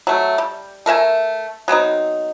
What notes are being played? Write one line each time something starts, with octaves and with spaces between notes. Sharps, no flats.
F#3 A3
G3
A3 A#4 E5 G#5
F#3 B3 C4 D#4